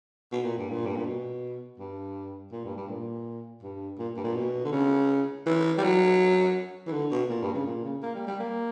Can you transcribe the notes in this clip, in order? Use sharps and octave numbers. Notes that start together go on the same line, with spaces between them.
B2
A#2
G2
A#2
G2
A#2
B2
G2
A#2
G2
G2
A#2
G2
A#2
G2
A#2
B2
D3
C#3
E3
G3
F#3
E3
D3
B2
A#2
G2
C#3
A#2
C#3
A#3
G3
G3
A#3